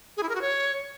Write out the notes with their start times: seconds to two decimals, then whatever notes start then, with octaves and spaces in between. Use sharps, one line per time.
0.17 G#4
0.23 E4
0.29 A#4
0.35 F#4
0.41 C#5